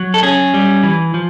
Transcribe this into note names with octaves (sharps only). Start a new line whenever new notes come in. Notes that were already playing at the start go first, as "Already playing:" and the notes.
Already playing: F#3
A4
C#4 G#4
G3
E3
F3